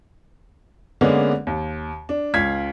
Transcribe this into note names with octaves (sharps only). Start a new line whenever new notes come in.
D3 G#3 A#3 B3 C#4 D4
D#2
D4
C#2 F5 G#6 B6